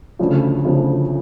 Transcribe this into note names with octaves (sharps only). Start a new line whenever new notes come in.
D2 C#3 F3 A3
D2 C#3 F3 A3